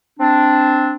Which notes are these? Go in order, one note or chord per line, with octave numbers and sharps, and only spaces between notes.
C4 D4